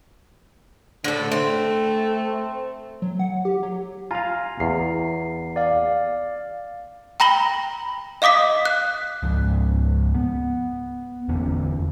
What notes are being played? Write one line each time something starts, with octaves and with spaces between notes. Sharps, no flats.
A2 D3 A4
A3 C4
F#3
F#5
G4
F#3
F4 F5 G#5 A#5
E2 C7
D5 F5
G5 A#5 B5 A#6 F#7 G7
D#5 F5 D6 D#6 B6
F#6
C#2 G#2 C#3 F3
B3
E2 D3 C#4